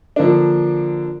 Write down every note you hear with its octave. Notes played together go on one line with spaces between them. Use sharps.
D3 F3 A#3 D4